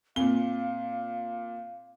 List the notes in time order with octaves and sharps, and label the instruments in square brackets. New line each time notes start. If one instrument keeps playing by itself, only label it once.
[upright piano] A#2 G7 [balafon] C4 [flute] F5